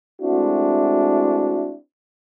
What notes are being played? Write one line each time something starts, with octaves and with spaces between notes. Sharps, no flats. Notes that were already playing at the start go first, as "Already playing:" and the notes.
G#3 A3 C4 D4 E4 F#4